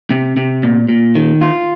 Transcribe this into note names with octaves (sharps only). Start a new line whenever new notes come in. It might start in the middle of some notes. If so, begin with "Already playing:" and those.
C3
C3
A#2
A#2
D#3
F4